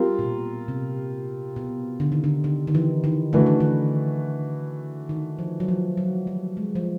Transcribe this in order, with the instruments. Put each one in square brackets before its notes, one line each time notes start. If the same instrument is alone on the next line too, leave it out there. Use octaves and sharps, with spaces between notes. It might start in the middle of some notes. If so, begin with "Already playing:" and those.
Already playing: [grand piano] G3 C4 F4 A#4
[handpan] A#2
B2
C3
B2
D3
D#3
D3
D3
D#3
E3
D#3
[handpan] D3 [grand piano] E3 A3 D4 F#4 B4
[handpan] D#3
D3
D#3
F3
F#3
F3
F#3
G3
G#3
F3